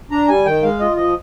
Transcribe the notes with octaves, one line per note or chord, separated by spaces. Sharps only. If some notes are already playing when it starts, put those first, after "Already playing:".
D4 A#5
G3 G#5
D#3 G5
G#3 F5
F4 D#5
F3 D#5